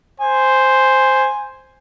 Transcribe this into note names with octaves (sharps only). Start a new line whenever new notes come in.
C5 G#5